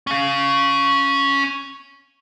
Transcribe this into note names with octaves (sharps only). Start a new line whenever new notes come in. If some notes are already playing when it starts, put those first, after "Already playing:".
C#4 F5